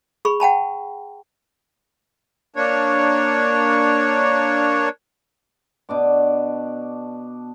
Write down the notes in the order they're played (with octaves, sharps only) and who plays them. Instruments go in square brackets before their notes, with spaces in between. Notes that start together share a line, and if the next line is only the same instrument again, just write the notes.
[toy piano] G#4 B5 C#6
F#5 G5 A5 B5
[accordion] A#3 D4 C#5
[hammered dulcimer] B2 D4 D6